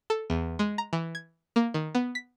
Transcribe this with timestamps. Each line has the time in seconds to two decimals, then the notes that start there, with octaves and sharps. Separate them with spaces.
0.10 A4
0.30 E2
0.59 G#3
0.78 A#5
0.93 E3
1.15 G#6
1.56 A#3
1.74 D#3
1.95 B3
2.15 B6